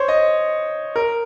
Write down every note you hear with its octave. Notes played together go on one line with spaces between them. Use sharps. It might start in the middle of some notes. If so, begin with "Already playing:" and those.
Already playing: C5 C#5
D#5
A#4